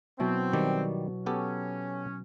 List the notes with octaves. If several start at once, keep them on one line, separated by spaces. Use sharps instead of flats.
B2 F#3 C4 E4
D#3 G3 D5
B3 C#4 G4 A4